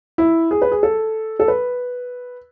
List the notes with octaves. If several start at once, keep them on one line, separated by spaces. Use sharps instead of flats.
E4
G#4
B4
G#4
A4
A4
B4